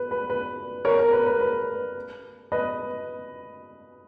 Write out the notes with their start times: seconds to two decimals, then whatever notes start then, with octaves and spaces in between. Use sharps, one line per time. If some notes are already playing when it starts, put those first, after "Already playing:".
Already playing: B4
0.11 B4
0.30 B4
0.85 A#4 C#5
0.99 A#4
1.13 B4
1.26 B4
1.41 B4
2.52 B4 D#5